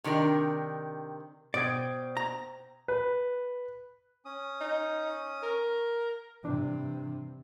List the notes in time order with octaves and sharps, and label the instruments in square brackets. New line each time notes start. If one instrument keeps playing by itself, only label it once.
[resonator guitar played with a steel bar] C3 D#3 D4 A#4
[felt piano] B2 D#6 G#6 [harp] C5 G5 [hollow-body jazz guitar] D5
[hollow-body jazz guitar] A#5
[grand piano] B4
[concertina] C#4 D#6
[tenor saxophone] D#4
A#4
[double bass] G2 C3 [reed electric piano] E3 D4